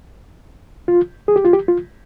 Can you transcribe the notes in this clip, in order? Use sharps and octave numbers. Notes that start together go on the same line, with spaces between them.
F4
G#4
G4
F4
G4
F4